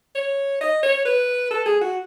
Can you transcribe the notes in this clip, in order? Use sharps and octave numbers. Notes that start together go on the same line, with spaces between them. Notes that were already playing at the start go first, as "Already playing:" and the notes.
C#5
D#5
C#5
B4
A4
G#4
F#4